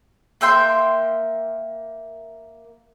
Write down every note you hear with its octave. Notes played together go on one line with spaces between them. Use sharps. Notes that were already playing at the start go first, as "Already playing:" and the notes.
A#3 E5 G5 C6